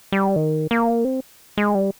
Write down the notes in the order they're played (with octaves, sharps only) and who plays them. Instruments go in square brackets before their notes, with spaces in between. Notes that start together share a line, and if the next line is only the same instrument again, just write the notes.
[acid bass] G3
D#3
A#3
C4
G#3
G3